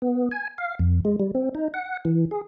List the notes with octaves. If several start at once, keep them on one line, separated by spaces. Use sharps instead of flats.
B3
G#5
F5
F2
G#3
G3
C4
D#4
F#5
E3
G#4